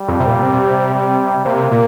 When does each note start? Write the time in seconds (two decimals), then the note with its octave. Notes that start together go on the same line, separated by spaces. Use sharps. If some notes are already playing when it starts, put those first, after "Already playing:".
Already playing: G3
0.08 F2
0.20 C3
0.27 A#2
0.42 C3
0.94 G3
1.45 C3 A#3
1.71 A#2